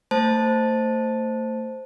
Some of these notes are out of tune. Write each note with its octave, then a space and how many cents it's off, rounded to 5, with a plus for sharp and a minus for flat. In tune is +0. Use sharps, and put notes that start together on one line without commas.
A3 +35 C5 +0 A5 +0